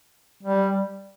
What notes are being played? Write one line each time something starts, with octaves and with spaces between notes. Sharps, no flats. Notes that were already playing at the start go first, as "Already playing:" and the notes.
G3